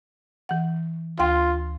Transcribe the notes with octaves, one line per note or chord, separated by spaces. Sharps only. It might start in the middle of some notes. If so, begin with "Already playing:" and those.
E3 F#5
D2 F4 G5 C6